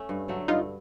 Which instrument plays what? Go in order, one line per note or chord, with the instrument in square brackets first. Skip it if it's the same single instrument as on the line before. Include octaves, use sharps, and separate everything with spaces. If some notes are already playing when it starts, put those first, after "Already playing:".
Already playing: [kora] A3 C#4
G2
D3 F#3 A3
[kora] G2 [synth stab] D#4 F4